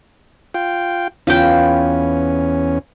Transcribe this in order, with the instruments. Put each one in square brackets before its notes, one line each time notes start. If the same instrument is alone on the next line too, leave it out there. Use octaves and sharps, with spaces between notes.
[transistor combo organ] F4 G5
[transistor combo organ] E2 C#4 [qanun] F4 B4 G5